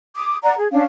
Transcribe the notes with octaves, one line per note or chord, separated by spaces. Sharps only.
D6 D#6
D5 F#5 A#5
G#4
C#4 D4 F5